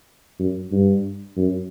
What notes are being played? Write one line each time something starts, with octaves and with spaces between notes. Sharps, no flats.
F#2
G2
F#2